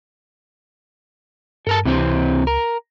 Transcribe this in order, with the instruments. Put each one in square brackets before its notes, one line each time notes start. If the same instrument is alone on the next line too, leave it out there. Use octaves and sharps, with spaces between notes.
[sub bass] G2 [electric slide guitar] A4 A#4 A5
[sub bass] C#2 [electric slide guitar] C3 E3 C4
[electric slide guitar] A#4